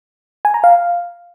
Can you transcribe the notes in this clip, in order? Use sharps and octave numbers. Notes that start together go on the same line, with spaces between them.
G#5
A#5
F5